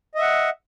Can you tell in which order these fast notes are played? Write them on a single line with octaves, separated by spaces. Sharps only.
D#5 E5 F#5